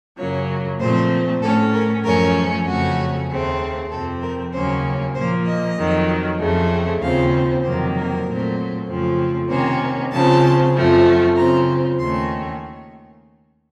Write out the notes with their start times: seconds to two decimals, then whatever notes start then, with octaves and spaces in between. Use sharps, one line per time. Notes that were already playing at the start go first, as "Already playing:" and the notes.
0.18 F#2 C#3 F#3 A#3 C#5
0.80 A#2 F3 A3 C4 C5
1.42 A2 A3 C#4 A4
1.73 A#4
2.04 F#2 F3 A3 C#4 A#4
2.66 F2 C#3 A3 C#4 F#4
3.29 D#2 C#3 A3 C4
3.91 F2 C3 F3 C4 A4
4.22 A#4
4.53 D#2 C#3 F#3 A#3 C#4 C5
5.15 A#2 F3 A#3 C5
5.46 D#5
5.77 F2 D#3 F#3
6.40 F2 C#3 A3 C4
7.01 D#2 C#3 F3 C4 F5
7.64 F2 C3 D#3 F#3 A#3 C5
7.95 A#4
8.26 A#2 F#3 A3 C4
8.88 F2 C#3 F3 A3 C4
9.50 C3 D#3 A#3 C#4 C5
10.12 C#3 F3 C4 A5
10.74 F#2 F3 A3 C4
11.36 C#3 F3 C4 A#5
11.99 D#2 D#3 A3 C#4 C6